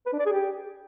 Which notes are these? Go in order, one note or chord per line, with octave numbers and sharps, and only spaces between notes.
B4
D4
D5
G#4
G4